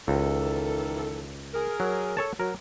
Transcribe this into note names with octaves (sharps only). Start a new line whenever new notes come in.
C#2 D#3 E3 A4
G#4 A#4
F#3
A4 C#5 A5
F#3 A#4